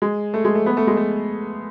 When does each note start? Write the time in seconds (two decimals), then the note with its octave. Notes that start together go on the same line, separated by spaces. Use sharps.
0.02 G#3
0.34 A3
0.45 G#3
0.55 A3
0.66 B3
0.77 A3
0.87 G#3
0.97 A3